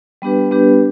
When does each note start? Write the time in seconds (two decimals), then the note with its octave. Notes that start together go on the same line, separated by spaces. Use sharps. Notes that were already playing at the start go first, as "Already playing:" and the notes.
0.22 G3 B3 D4 G4 B4
0.51 G3 B3 D4 G4 B4